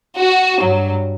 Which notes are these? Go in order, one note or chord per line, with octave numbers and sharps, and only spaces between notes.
F#4
G2 F#3